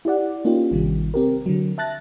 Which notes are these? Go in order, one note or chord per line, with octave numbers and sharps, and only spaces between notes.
E4 G4 D5 F#5
A#3 C#4 D#4 F4 G4
A1 C3 D#3 G3
C4 G4 A#4
D3 F#3
E5 A5 F#6 A6 A#6